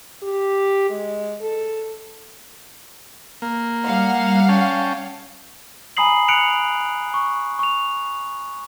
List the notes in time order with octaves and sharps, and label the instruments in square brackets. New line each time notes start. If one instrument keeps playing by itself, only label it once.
[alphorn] G4
G#3
A4
[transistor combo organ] A#3
[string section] G3 F5 F#5
[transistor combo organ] C#4 G5 A5
[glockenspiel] G#5 A#5 B5 D#6 C7 F#7
F#6 C#7 D7 F7 F#7
C#6
C#6 F7